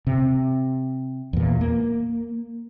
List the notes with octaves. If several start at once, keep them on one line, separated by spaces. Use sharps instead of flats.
C3
E2 A#2
A#3